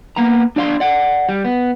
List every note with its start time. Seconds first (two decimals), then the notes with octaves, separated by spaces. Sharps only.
0.16 A#3 B3 A#5
0.56 D4 F4 D5 F5 G5 C6
0.80 D5 F#5
1.29 G3
1.45 B3